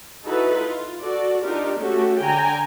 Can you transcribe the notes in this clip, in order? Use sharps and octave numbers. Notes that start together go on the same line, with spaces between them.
D#4 E4 F#4 A4 B4
F4
F#4 A4 D5
D4 D#4 F4 G4 A#4
A3 C#4 F#4 G4 A4
D3 G5 G#5 A#5